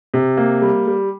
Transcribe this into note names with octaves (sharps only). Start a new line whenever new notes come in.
C3
A#3
G3
G3